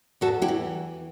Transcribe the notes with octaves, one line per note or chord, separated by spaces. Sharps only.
E2 F#4 A4
E4 G4
E3